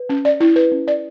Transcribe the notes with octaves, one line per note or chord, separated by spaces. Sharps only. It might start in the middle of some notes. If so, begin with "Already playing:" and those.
Already playing: B4
C#4
D5
E4
B4
C#4
D5